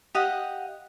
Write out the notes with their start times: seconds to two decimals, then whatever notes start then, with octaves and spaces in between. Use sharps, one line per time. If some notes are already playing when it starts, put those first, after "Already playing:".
0.15 G4 D#5 F5 F#5